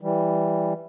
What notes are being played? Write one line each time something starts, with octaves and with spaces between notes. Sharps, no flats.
E3 G3